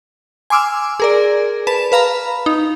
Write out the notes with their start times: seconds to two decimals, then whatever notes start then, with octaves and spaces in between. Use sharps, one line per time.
0.50 G#5 C6 D6 E6 F6
1.00 G#4 A#4 D5
1.67 B4 A5 E7
1.92 B4 F5 A#5 B5
2.46 D#4